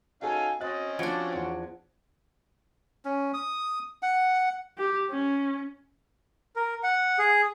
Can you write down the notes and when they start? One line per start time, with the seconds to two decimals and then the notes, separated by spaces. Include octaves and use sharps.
0.22 C#4 D#4 F#4 A4 F5 G#5
0.60 C4 C#4 F#4 D#5 F#6 A6
0.99 F3 D4 F#4 G#6 C#7 D7
1.32 E2 F#5
3.05 C#4
3.34 D#6
4.03 F#5
4.78 G4
5.10 C#4
6.56 A#4
6.83 F#5
7.19 G#4